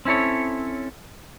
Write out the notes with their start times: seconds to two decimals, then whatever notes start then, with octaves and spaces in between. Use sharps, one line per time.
0.05 C4 C#4 E4 A4 C#5